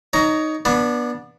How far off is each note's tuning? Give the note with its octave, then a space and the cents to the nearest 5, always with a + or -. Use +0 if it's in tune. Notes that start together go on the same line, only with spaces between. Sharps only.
D#4 +0 C#5 +25 A#5 +0
B3 -25 D4 +0 B5 +0